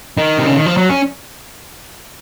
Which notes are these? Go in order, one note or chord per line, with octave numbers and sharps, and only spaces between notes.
D#3
C3
C#3
D#3
F3
F#3
C#4